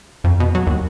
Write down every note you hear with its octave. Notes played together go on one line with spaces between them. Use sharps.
F2
B2
F#3
D#2